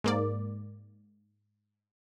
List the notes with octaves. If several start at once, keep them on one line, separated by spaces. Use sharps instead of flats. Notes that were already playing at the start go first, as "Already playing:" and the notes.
G#2 A#3 D5